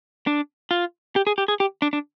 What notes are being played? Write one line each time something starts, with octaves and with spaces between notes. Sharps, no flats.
D4
F4
G4
G#4
G4
G#4
G4
D4
D4